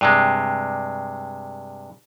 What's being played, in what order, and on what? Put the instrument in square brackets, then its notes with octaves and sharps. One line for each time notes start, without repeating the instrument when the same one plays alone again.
[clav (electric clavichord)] G2 C3 G#3